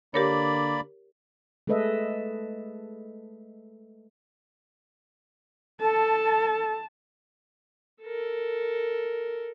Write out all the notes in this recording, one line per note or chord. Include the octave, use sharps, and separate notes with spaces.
D3 A#3 G4 A#4 C#5 D5 B5
G#3 A3 A4 B4 D#5 E5
A4 A5
A4 A#4